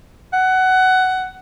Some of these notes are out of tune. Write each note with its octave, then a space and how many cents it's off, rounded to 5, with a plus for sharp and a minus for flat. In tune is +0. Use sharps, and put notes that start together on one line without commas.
F#5 +15